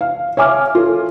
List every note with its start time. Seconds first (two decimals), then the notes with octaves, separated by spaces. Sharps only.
0.01 F5
0.37 C#5 E5 G#5 D6 F6
0.75 F4 A4